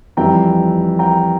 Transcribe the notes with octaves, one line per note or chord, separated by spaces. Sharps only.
F2 E3 G3 G5 A#5
G5 A#5